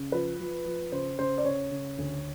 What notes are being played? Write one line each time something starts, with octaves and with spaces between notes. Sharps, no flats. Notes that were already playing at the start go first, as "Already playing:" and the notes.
Already playing: C#3
F3 B4
F3
F3
C#3 C5
C#3 C5
D5
C#3 C#5
C#3
D2